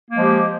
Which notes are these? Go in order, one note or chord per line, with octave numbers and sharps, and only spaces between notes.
F3 G#3 A#3 G4